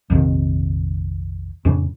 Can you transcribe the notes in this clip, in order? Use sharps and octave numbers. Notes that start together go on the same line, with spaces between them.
A#1 F2 C3 D#3
F2 A2 C#3 D4